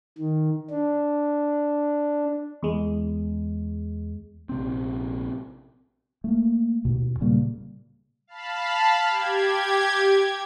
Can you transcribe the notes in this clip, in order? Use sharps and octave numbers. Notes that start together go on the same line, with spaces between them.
D#3
D4
E2 G#3
A#1 C3 C4
A3 A#3
D#2 B2
A#2 C#3 G3 A#3
F5 A5 B5
G4 G#6